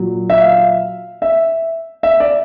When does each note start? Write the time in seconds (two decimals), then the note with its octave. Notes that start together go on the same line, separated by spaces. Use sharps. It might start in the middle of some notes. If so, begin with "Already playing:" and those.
Already playing: A#2 F#3
0.30 E5
0.40 F5
1.22 E5
2.03 E5
2.20 D5